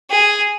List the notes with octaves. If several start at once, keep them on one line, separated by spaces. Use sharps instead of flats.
G#4